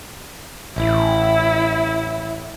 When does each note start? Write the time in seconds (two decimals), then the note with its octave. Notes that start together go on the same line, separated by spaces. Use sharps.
0.76 A1 E4